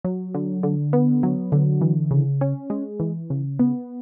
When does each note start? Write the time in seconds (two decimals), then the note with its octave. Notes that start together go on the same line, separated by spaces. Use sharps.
0.04 F#3
0.34 D3
0.63 D3
0.93 B3
1.23 F#3
1.52 D3
1.81 E3
2.11 C#3
2.41 C#4
2.70 G#3
3.00 E3
3.30 C#3
3.59 B3